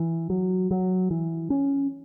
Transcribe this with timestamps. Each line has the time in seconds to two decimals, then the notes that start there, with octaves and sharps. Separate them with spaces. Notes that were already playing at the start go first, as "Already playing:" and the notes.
Already playing: E3
0.30 F#3
0.71 F#3
1.11 E3
1.50 C#4